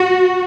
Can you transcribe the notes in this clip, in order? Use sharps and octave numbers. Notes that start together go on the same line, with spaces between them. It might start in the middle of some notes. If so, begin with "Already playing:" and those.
Already playing: F#4